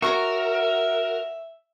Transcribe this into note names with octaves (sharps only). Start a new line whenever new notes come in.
F#4 A#4 C#5 E5 A#5 C#6